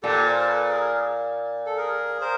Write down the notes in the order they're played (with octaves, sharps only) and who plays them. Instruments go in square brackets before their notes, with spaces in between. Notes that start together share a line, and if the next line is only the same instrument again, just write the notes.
[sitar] A#2 [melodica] G4 A4
[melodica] A#4 C5
A4 B4
G#4 A#4
A4
G#4 A#4
A#4 C5